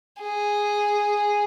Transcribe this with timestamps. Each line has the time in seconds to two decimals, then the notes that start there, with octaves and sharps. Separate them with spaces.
0.21 G#4